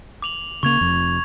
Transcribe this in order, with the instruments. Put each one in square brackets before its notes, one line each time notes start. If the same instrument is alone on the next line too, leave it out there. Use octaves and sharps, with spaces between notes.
[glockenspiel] D6 F7 F#7
[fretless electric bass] C#3 A#3 [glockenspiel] C#6 G#6 F7
[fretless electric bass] F1 F2